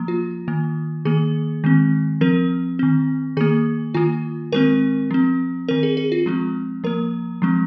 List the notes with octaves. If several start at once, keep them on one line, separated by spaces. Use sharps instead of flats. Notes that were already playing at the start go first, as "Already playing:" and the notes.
Already playing: F3 A#3
F4
D#3 A#3
D#3 A#3 G#4
D#3 G#3 C4
F3 C4 A#4
D#3 C4
D#3 A#3 G#4
D#3 A#3 F4
D#3 G#3 C4 A#4
F3 C4
D#3 C4 A#4
G#4
G#4
F4
F3 G#3 C4
F3 A#3 A#4
F3 G#3 C4